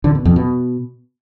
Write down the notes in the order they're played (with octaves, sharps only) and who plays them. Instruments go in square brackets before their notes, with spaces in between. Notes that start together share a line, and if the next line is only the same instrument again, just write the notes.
[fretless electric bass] D3
B2
F2
B2